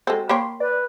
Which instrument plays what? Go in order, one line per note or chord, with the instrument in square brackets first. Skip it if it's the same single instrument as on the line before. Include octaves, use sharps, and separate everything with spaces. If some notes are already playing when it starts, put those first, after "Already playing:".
[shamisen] G#3 C4 [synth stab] F#4 A4 C5
[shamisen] A#3 C#5 G5 [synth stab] B5 C6
[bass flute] B4 [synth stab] D5